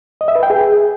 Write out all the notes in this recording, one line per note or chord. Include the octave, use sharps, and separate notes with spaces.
D#5
E5
B4
G5
G#4